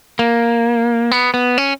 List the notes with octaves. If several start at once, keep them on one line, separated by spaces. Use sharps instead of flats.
A#3
B3
B3
C#4